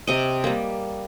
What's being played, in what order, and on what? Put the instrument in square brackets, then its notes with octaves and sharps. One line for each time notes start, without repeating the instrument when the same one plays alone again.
[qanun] C3 D#5
G3 A#3